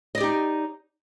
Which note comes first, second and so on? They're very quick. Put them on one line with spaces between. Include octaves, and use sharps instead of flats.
D#5 D5 G4 D#4